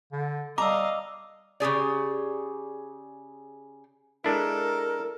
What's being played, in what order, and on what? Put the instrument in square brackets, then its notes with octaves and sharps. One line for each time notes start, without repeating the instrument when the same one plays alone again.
[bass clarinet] D3
[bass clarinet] G3 [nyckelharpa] D#5 F5 [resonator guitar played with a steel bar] A#5 [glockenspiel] D6 E6
[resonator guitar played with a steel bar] C#3 G4 G#4 D5
[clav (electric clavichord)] G#3 D4 E4 [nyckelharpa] A4 [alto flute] A#4